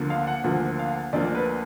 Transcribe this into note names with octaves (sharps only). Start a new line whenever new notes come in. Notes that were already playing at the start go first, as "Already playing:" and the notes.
Already playing: D2 D3 F3 A#3
F5
F#5
D2 D3 F3 A#3
F5
D2 D3 F3 A#3 D5
B4